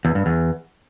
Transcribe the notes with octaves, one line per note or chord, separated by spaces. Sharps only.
E2
G2
E2